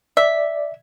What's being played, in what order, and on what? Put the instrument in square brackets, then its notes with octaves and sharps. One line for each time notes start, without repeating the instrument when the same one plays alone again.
[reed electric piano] D5 [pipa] E5